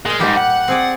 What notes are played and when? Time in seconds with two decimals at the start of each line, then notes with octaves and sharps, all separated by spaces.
0.06 A#2 G#3 F5
0.20 E2 G#2 G3 G4
0.37 F#5
0.68 C4 G#4 D5